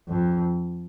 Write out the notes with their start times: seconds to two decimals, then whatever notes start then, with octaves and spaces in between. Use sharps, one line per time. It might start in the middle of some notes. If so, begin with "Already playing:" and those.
0.08 F2